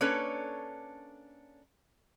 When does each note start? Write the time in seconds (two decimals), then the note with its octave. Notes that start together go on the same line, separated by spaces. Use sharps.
0.01 A#3 C#4 D4 A4 B4 C#5